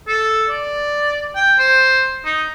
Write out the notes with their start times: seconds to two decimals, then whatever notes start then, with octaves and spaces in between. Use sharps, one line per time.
0.08 A4
0.50 D5
1.35 G5
1.59 C5
2.25 D#4